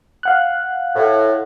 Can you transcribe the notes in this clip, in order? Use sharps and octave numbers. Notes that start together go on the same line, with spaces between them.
F5 F#5 F#6
A2